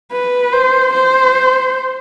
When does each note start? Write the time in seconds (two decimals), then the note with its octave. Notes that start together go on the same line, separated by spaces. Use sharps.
0.12 B4
0.52 C5
0.93 C5